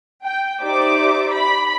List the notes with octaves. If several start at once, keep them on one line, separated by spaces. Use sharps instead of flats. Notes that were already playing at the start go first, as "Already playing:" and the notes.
G5
D#4 G4 C5 D5 E5 D6
B5